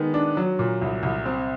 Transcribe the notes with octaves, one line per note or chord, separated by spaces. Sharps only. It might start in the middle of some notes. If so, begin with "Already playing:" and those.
Already playing: D#3 G#3 B3
D4
F#3
A#2
C2
C2
C4